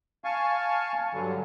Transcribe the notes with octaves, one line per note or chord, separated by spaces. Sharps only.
F5 G#5 A5 C#6
G2 D3 F#3